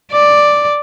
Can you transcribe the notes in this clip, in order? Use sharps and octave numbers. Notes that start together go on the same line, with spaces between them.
D5